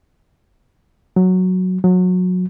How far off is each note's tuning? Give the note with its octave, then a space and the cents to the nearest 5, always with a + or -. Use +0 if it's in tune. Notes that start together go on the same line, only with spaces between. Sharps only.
F#3 -5
F#3 -25